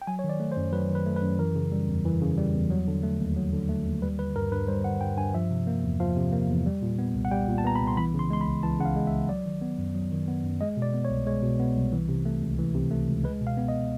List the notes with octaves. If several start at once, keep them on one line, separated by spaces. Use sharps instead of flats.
G5
F#3 G#5
C#5
D#3
D5
A3
C5
F#2
F#3 B4
D#3
B4
A3
B4
F#2
E3 A#4
C#3
G3
E2
E3
C#3
G3
E2
F#3
D3
A3
D#2
F#3
D3
A3
D#2
G3 B4
D3 B4
G2 A#4
G2 B4
G3 C5
D3 F#5
G2 G5
G2 G#5
F3 E5
C3
A#3
E2
F3 F5
C3
A#3
E2
G3
A#2
B3
C2
F#5
G3 G5
A#2
A5
B3 A#5
B5
C2
C6
E3 B5
C#3
C6
G#3 C6
B5
C#2
E3 A5
C#3 F#5
F5
G#3
E5
C#2
F#3 D5
D#3
B3
F#2
F#3
D#3
B3
F#2
G#3 D#5
B2
D5
B3
C#5
C2
G#3 C#5
B2
B3
C2
E3
C3
A3
C#2
E3
C3
A3
C#2
G#3 B4
B2
F5
B3
D#5